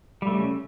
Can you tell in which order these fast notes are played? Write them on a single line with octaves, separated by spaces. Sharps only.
G3 A3 C#3